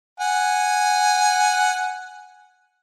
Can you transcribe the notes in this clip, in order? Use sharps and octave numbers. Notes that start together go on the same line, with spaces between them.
F#5 G#5